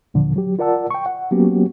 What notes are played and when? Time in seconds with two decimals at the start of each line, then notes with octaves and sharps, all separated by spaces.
0.14 D#2 A#2 D3 F3
0.36 F#3 G4
0.59 F4 A#4 D5 F#5 A5 E6
0.91 G5 C#6
1.06 F#5
1.31 F#3 A#3 B3 C#4 F#4 G4